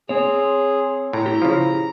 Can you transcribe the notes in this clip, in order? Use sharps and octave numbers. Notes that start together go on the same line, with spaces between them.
C4 G#4 C#5
A2 A#5
E4 G4
C#3 F3